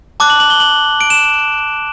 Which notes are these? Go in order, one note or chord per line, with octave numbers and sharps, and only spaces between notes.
A5 D6 F#6
F#7
F#7
G7
F#7
D7
E7